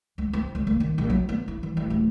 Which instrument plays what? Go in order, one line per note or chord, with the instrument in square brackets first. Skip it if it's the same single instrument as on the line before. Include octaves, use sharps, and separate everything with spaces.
[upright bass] C#2
C4
C#2
A#3
D#3
A#1
F#3
B3
E4
E3
A1
D1